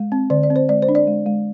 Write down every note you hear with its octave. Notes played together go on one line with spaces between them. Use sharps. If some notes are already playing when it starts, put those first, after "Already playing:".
Already playing: G#3
C4
D3 D5
D5
C4
C5
G#3 D5
C5
D4
D5
G#3
G#3